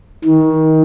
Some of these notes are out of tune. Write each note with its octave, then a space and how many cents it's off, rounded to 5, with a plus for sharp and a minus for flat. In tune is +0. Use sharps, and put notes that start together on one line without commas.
D#3 +25